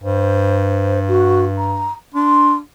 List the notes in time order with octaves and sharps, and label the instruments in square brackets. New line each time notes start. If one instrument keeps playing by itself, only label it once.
[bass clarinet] G2 [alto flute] C5
[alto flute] F#4
A#5
[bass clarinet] D4 [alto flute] C6